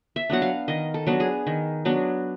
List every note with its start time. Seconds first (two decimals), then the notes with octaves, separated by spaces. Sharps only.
0.16 E5
0.30 F#3 B3 D4 F#5
0.42 F5
0.68 D#3 D#5
0.94 A4
1.07 F#3 B3 D4
1.20 G#4
1.47 D#3
1.85 F#3 B3 D4